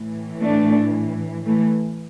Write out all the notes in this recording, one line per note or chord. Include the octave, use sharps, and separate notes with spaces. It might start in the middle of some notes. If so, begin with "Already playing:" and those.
Already playing: A2 E3
A3 D4
E3 A3